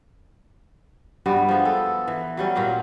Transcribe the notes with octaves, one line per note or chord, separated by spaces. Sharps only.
G2 G3 B3 F#4
F3 G#3 B3 B4
A4
E3
F#3 G3 C#4
A#2 F#4 G4 F5